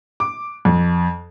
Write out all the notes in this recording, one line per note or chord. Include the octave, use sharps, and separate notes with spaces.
D6
F2